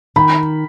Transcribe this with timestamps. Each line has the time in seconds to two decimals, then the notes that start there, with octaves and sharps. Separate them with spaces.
0.16 D#3 B5